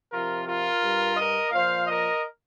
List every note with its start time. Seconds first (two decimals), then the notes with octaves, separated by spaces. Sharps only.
0.12 C3 F3 F4 A#4
0.47 F4 A#4
0.82 G2 G3
1.17 A#4 D#5
1.51 A#2 F3 C5 F5
1.86 A#4 D#5